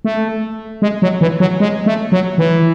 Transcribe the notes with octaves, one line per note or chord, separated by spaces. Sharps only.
A3
G#3
F#3
E3
F#3
G#3
A3
F#3
E3